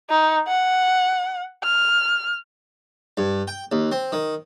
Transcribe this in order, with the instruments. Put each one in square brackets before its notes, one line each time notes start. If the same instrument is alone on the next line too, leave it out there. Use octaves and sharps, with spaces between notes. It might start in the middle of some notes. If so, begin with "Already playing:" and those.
[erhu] D#4
F#5
F6
[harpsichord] G2
G5
D#2
C4
D#3